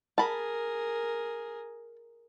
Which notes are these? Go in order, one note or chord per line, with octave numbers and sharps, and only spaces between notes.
G#4 A#4 A5 B5